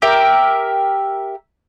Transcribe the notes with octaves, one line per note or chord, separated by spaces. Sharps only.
G4 A#4 E5